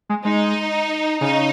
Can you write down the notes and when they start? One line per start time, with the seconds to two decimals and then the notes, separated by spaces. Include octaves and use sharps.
0.09 G#3
0.25 G#3 D#4
1.21 C#3 D#4